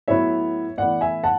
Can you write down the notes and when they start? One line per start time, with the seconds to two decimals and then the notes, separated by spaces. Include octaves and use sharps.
0.08 A2 F#3 B3 C#5 E5
0.77 A2 E3 B3 D5 F#5
1.01 E5 G#5
1.24 F#5 A5